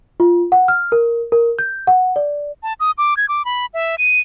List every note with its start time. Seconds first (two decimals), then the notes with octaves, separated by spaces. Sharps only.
0.20 F4
0.52 F#5
0.68 F6
0.92 A#4
1.32 A#4
1.59 G6
1.87 F#5
2.16 D5
2.63 A5
2.80 D#6
2.98 D6
3.17 G#6
3.29 D6
3.45 B5
3.74 E5
3.98 D#7